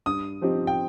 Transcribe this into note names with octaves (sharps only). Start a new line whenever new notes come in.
G2 D#6
F3 C4 D#4 G4
G5